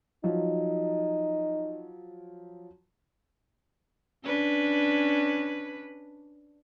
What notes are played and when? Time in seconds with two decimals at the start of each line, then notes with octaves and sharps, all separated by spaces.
0.24 F3 F#3 D#4
4.24 C#4 D4 B4